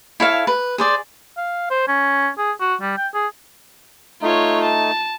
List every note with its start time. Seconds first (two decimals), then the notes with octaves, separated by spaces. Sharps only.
0.20 E4 A4 C#5 F5
0.47 B4
0.78 G#4 C5 D5
1.37 F5
1.71 C5
1.88 C#4
2.38 G#4
2.61 F#4
2.81 G3
2.97 G5
3.14 G#4
4.22 A3 D#4 F4 C#5
4.63 A5